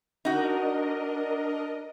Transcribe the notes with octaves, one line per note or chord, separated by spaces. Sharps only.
D4 D#4 F#4 A#4 D#5